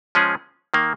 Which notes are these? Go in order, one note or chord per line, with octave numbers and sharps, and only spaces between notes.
F3 G#3 C#4 G#4
D#3 A#3